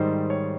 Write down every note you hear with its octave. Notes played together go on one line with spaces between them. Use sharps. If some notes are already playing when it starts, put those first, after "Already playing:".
Already playing: G#2 D#3 G3 C5
C#5